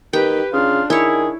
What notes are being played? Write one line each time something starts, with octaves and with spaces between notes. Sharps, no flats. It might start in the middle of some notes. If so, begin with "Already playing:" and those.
D#3 G4 B4 G5
C#3 D4 F4
D#3 E4 G#4 C#5